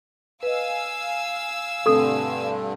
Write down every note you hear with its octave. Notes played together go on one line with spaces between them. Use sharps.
B4 D#5 F5 G#5 E6
G2 B2 D3 A3 C4 A4 D#6